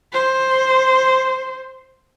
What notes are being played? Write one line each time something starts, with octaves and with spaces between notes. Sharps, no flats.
C5